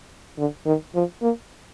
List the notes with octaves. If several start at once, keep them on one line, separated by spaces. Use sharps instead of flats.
D3
D#3
F3
A#3